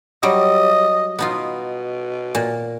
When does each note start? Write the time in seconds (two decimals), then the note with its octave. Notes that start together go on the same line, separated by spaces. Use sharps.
0.23 F#3 G3 D#5
1.19 B2 B3 D#4 F4
2.35 A#2